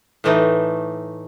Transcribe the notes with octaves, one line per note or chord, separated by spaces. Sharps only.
A2 E3 A3 D#4